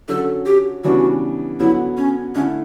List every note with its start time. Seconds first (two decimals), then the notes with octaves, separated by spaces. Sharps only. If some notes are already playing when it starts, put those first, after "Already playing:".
0.08 D3 F#3 C#4 A4
0.46 G4
0.84 C#3 E3 G3 B3 D4 F#4
1.60 D3 F#3 B3 E4
1.97 C#4
2.35 D3 A3 C#4 E4